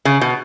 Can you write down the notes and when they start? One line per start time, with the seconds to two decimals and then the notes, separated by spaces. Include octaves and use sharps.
0.05 C#3
0.21 B2